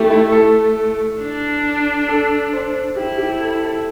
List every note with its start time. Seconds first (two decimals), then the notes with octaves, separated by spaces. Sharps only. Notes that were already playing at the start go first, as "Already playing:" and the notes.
Already playing: A3 E4 G4
0.11 E4
0.32 A4
1.21 D4
2.08 A4
2.53 C5
2.96 E4 G4
3.18 G4
3.41 A4
3.62 A4